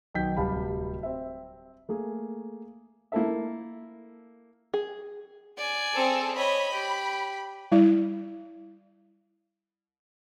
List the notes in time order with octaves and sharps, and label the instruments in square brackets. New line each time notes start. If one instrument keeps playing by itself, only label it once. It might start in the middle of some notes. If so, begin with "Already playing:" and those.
[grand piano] B1 D#3 G5 G6 B6
D1 C3 G3 F5 A5 B5
C4 E5
A3 A#3 G#4
[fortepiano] A#3 E4 A4 E5
[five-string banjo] G#4
[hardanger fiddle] D5 G#5
[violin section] C4 G#4 A4
[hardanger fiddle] C#5 D#5 [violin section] B5
[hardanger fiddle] G4
[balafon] G3 E4 D5